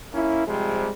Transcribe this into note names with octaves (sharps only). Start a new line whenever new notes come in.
A#3 C#4 E4
C3 F3 G3 G#3